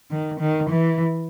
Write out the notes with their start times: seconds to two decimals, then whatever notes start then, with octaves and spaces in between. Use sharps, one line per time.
0.11 D#3
0.40 D#3
0.70 E3